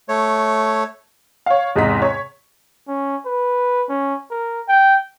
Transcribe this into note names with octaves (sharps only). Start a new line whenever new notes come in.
A3 C#5
C#5 F5
E2 G#2 C3 D#5 A#5 B6
C#5
C#4
B4
C#4
A#4
G5